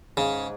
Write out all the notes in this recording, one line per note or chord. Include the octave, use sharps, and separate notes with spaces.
G#2 C#3